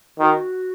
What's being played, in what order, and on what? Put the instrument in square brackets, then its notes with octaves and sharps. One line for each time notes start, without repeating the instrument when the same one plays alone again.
[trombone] D#3 [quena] F#4